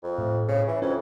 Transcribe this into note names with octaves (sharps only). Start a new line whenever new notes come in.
F2
A2
C#3
E3
F2 C#4